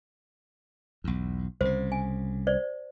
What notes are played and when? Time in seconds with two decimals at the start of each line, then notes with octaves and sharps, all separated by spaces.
1.04 B1 E2
1.61 C2 C#3 C5
1.92 G#5
2.47 C5 D5